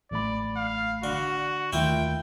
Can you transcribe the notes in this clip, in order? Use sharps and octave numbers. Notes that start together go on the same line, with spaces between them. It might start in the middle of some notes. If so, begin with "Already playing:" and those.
A1 A3 D5 B5
F5
D3 F#4
D#2 D#3 A3 E4 F4 G5